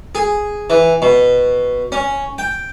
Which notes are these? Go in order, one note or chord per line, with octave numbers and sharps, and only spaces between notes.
G#4
E3
B2
C#4
G5